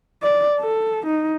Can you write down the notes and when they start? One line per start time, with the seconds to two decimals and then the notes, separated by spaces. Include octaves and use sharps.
0.23 D5
0.60 A4
1.06 D#4